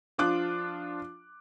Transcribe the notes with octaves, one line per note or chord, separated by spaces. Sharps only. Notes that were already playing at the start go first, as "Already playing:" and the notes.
F3 D4 F4 D6 F#6